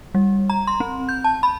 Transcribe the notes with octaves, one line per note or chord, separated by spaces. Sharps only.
G3
A#5
C6
C4
G6
A5
B5